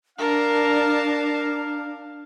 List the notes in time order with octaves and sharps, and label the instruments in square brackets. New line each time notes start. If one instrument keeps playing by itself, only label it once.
[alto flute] D4 [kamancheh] A#4 A5 [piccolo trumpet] F5